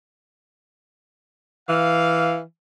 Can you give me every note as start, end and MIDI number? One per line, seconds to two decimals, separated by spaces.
1.69 2.42 52
1.69 2.39 77